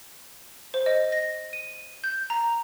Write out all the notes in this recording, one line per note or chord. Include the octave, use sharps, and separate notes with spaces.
C5
D#5
A#6
D#7
G6
A#5